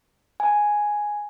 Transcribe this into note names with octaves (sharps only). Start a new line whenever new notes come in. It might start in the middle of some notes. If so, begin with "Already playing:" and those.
G#5